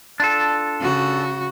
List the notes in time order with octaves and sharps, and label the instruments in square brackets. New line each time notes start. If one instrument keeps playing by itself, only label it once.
[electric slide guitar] D4 F4 A4
[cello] C#3 F#4